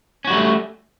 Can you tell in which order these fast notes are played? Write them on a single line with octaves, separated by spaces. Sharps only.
C#4 F#4 G3 A3